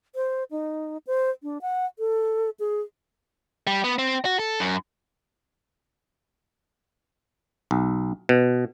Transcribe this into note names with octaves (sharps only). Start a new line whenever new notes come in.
C5
D#4
C5
D4
F#5
A4
G#4
G3
B3
C4
F#4
A4
F#2
B1
B2